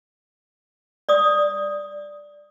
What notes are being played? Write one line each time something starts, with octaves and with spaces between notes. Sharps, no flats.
D5 D#6